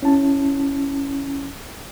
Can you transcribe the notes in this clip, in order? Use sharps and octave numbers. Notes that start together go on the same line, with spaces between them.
C#4 E4 A5